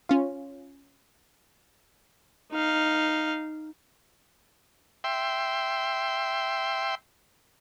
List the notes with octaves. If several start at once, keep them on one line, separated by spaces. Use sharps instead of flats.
C#4 F4
D#4 F5
E5 G5 C6